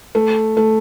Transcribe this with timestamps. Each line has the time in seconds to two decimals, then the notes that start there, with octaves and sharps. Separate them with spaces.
0.15 A3
0.57 A3